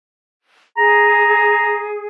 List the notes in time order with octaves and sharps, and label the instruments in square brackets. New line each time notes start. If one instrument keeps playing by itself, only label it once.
[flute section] G#4 [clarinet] A#5